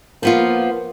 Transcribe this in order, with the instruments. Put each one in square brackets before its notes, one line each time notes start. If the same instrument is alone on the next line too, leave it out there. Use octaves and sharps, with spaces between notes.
[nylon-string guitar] F3 B3 F4 [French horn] A#3